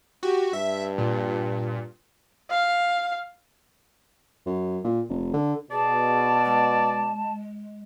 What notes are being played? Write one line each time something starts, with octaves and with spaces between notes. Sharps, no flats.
F#4 G4
G2 E5
A#2
F5
F#2
A#2
F1
D3
B2 G#4 D5 A5
G#3